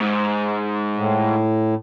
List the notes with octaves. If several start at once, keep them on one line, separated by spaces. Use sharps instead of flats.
G#2
A2